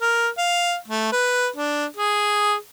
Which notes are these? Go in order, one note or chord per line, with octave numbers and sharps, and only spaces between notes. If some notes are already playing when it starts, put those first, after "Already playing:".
A#4
F5
A3
B4
D4
G#4